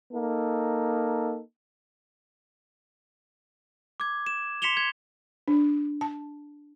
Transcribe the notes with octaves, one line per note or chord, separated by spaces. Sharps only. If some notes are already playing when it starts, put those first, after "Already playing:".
A#3 D#4 A4
D6 G#6
E7
C6 B6 C#7 E7 F7 G7
G#6
D4
A5